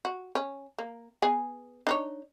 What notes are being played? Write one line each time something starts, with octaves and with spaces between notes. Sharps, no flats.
F#4
C#4
A#3
B3 G#4 G#5
D4 D#4 C#5